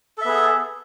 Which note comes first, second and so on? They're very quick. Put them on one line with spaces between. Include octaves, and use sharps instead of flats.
A4 E5 B3 G#4